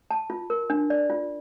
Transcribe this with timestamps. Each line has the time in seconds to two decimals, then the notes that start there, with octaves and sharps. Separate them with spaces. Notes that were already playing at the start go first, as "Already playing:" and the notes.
0.11 A5
0.30 F4
0.50 A#4
0.70 D4
0.90 D5
1.10 F4